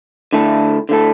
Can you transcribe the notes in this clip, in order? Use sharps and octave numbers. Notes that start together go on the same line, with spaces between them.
D3 A3 E4 A4
D3 A3 E4 A4